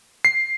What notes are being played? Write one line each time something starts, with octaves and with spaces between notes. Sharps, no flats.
C7